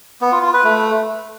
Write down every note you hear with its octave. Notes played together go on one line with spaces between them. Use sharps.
B3
F4
F4
B4
A3